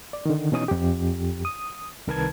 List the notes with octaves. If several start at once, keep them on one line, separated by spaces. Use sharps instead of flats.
D5
D3 D#3
B2 E3 C#4 D#4 D#6
F2 G4
D#6
C2 D#3 A#4 B4 A5 G#6